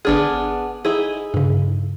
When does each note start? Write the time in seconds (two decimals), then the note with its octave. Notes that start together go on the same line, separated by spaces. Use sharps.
0.05 G1 B3 D4 G#4 F6
0.85 D#4 E4 G#4
1.34 G2 C#3